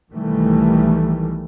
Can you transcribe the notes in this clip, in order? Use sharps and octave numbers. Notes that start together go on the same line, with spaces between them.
B1 D#3 E3 G3 A3